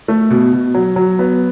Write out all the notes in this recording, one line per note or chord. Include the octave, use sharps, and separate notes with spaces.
A3
B2
B2
F#3
F#3
B3